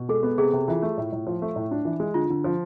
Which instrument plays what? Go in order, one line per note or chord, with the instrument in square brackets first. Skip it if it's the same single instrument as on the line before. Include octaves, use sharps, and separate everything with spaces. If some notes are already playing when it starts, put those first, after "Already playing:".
Already playing: [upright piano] B2
[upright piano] G#3 [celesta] A4
[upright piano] B3
[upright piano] C3 [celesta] G#4
[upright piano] C3
[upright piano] E3 [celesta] F4
[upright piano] A3
A2
A2
F3
A3
A2
D4
E3
G#3
[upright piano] D3 [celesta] F4
[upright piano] D3
F3